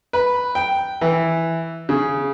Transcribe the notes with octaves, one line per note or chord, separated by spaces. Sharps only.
B4
G5
E3
C#3